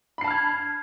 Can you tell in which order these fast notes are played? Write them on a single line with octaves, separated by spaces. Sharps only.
B5 C7 A5 F6 G#6